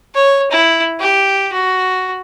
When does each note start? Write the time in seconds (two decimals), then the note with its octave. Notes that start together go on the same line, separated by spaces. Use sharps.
0.15 C#5
0.51 E4
1.00 G4
1.52 F#4